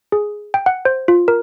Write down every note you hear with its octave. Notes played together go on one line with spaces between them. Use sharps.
G#4
G5
F#5
C5
F4
A#4